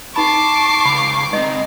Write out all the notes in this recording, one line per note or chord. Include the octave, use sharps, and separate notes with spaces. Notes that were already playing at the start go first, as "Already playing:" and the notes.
D#4 A5 B5 C#6 D6 C7
C#2 B5
G#3 C4 D#4 D#5